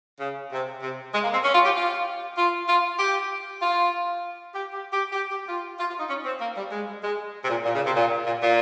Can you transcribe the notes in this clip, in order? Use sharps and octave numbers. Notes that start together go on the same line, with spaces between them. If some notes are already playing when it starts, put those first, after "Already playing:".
C#3
C3
C3
G#3
A#3
C4
C#4
F4
G4
F4
F4
F4
G4
F4
G4
G4
G4
G4
G4
F4
F4
F4
D#4
C#4
C4
A#3
G3
G#3
G#3
C3
A#2
A#2
C#3
C3
A#2
A#2
A#2